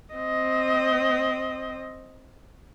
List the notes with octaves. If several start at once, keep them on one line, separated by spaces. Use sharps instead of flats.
C4 D#5